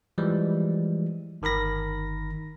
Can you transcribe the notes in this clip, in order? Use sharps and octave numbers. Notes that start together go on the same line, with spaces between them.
E3 F3 G3 G#3
G1 D#3 A#4 B5 A#6